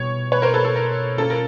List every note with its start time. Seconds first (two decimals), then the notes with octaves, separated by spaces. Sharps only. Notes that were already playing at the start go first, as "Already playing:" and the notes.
Already playing: B2 G3 B3 E4 C#5
0.32 B4 C#5
0.42 A#4 C5
0.54 A4 B4
0.64 A4
0.76 A#4
1.17 A#3 C#4 F4 A4
1.30 A#4